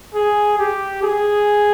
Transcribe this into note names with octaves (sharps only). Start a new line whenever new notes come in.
G#4
G4
G#4